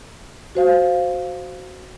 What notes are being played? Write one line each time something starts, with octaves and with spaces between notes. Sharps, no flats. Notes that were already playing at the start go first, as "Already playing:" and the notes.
F#4 C5 F5